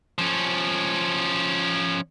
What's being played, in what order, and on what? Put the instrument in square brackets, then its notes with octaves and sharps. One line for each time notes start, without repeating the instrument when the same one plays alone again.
[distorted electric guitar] F3 C#4